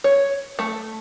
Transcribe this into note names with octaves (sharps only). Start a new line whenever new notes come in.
C#5
A3